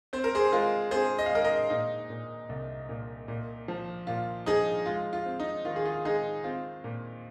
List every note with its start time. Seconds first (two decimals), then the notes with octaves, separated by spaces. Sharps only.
0.13 C4 C5
0.24 A#4
0.35 G#4 C5
0.52 G#3 F4 A#4
0.91 C4 G#4 C5
1.19 D#5
1.26 F5
1.30 G#3 A#4 D#5
1.44 A#4 D#5
1.70 A#2 D#4
2.10 A#2
2.49 C2
2.89 A#2
3.28 A#2
3.68 F3
4.07 A#2 F4
4.46 F3 D#4 G#4
4.86 G#3 F4
5.13 F4
5.25 C4
5.40 D#4
5.65 D#3 F4
5.76 G#4
5.86 F4
6.05 G#3 D#4 G#4
6.44 C4 F4
6.84 A#2